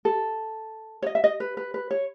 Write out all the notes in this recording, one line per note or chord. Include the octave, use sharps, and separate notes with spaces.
A4
C#5
D#5
E5
D#5
B4
B4
B4
C#5